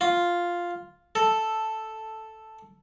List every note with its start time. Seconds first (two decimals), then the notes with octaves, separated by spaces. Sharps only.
0.01 F4
1.15 A4